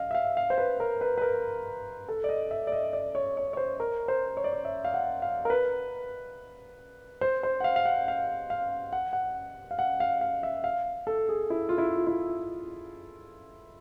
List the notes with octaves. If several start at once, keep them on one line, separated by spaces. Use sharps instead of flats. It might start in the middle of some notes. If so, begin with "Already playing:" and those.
Already playing: D#5 F5
E5
F5
F5
C5
B4
A#4
B4
B4
A#4
A4
D5
D#5
E5
D5
D#5
D5
C#5
C#5
C#5
C5
A#4
C5
C#5
D5
C#5
E5
F5
F#5
F5
A#4
B4
C5
C5
F#5
F5
F5
F#5
F5
F5
F#5
F#5
F5
F#5
F5
F5
E5
F5
A4
G#4
E4
F4
E4
F4
E4